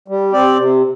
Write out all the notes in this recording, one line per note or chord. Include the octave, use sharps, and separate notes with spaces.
G3
C4 G4 D5
C3